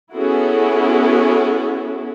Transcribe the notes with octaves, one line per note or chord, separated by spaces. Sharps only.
B3 C#4 E4 F#4 G#4 A4